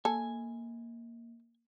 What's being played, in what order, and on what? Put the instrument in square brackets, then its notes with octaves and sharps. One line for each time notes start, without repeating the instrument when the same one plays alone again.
[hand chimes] A#3 [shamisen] A4 [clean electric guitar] G#5